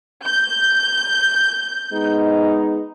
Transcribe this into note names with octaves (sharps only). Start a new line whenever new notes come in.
G6
G#3 B3 D#4